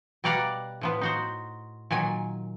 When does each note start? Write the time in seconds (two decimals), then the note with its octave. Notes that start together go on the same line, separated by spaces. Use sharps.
0.24 B2 G3 D5 F5 F#5 A#5
0.81 A2 F3 B3
1.01 D#4 F#4 C5
1.91 A#2 D#3 F#3 G#5